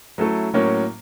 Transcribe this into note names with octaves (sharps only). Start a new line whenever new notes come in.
F#3 A3 C#4 E4 A4
A2 F#3 A#3 C#4